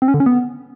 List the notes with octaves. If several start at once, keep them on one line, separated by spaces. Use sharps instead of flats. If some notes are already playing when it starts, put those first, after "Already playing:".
C4
C#4
D3
C#4
B3